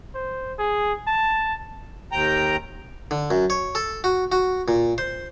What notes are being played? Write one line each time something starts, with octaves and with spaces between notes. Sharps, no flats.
C5
G#4
A5
D#2 G5 A#5
D3
F#2
C#5
A4
F#4
F#4
A#2
C5